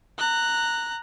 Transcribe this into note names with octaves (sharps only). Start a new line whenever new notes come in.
A#5 F#6